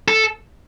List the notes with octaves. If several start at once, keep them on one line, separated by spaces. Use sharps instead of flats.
A4